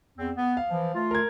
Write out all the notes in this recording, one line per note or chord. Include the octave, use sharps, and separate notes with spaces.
E2 C4
B3
F5
E3 F3
A3 F4
A#4 G#6